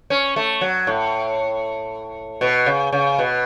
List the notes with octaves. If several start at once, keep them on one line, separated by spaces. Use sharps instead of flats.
C#4
A3
F#3
A2
B2
C#3
C#3
B2